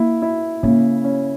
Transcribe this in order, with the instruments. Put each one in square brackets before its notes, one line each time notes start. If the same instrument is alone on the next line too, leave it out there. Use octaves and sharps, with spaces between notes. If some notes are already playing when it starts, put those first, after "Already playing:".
Already playing: [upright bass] A#3 [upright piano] E4
[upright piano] E4
[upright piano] C#3 [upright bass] A#3
[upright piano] C#4